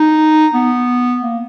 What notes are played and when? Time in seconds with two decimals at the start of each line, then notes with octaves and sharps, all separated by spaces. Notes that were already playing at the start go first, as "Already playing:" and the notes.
Already playing: D#4
0.54 B3
1.23 A#3